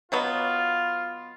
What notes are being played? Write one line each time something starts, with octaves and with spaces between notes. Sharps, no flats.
B2 F#3 B3 F4